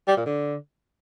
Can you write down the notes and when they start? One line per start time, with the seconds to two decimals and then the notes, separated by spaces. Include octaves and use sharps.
0.08 G3
0.17 A#2
0.26 D3